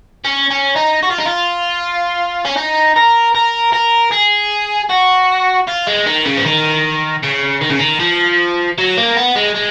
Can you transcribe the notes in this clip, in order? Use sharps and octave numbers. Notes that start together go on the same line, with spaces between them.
C#4
C#4
D#4
F#4
F4
D#4
F4
C#4
D#4
A#4
A#4
A#4
G#4
F#4
F4
G#3
D#3
C#3
F3
D#3
C#3
D#3
C#3
D#3
F3
F#3
A#3
B3
G#3
G#3